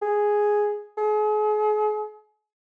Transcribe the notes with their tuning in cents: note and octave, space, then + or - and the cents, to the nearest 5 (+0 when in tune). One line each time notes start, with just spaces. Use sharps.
G#4 +0
G#4 +40